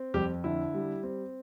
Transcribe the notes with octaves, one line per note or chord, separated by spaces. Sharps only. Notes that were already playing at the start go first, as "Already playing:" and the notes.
Already playing: C4
F2 G3 G4
D3 E4
G3
C4